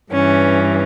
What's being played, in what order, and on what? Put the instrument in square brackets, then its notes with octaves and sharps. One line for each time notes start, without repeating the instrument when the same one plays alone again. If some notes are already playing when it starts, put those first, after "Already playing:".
[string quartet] G2 E3 C#4